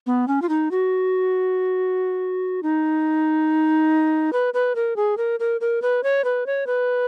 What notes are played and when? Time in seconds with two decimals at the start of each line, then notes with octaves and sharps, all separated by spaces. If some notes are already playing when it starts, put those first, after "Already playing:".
0.07 B3
0.28 C#4
0.42 F4
0.49 D#4
0.71 F#4
2.63 D#4
4.33 B4
4.54 B4
4.75 A#4
4.96 G#4
5.17 A#4
5.40 A#4
5.61 A#4
5.82 B4
6.03 C#5
6.24 B4
6.46 C#5
6.67 B4